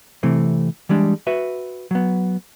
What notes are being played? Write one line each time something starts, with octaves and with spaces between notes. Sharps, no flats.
C3 E3 A3 C4
E3 G3 G#3 D4
F#4 B4 E5
F#3 B3